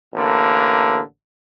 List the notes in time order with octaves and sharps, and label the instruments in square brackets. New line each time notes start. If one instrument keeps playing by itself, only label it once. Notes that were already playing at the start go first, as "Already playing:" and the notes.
[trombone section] A1 D3 A#3